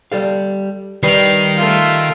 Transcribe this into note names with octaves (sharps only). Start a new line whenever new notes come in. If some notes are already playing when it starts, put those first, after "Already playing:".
G3 A4 F5
D#3 G3 B4 C7 F7
A3 F4